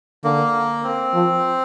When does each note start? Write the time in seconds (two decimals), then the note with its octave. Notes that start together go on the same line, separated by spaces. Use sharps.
0.24 D3 A#3
0.84 C4
1.14 F3